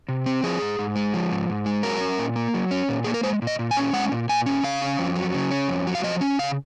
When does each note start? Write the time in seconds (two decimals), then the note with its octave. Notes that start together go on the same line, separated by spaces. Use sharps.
0.09 C3
0.26 C4
0.43 F3 G#4
0.62 G#2
0.79 G#2
0.96 G#3
1.14 F3
1.31 G#2
1.49 G#2
1.66 G#3
1.83 F#3 A#4
2.01 C#4
2.19 A#2
2.36 A#3
2.54 F#3
2.71 C#4
2.89 A#2
3.04 A#3 G#4
3.14 A#4
3.23 G#3 C5
3.42 A#2
3.47 D#5
3.59 A#2
3.71 G#5
3.77 C#4
3.93 G#3 F#5
4.12 A#2
4.29 A#2 G#5
4.46 C#4
4.63 C#3 F5
4.82 C#4
4.99 F2
5.16 F#3
5.34 C#3
5.51 C#4
5.68 F2
5.87 F#3
5.95 F5
6.03 F3 D#5
6.21 C#4
6.39 C#3 F5